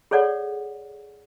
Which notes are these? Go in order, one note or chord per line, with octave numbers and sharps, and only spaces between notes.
G#4 A4 C#5 D5 F#5